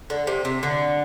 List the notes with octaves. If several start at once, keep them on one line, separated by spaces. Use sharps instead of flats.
D3
C3
C3
D3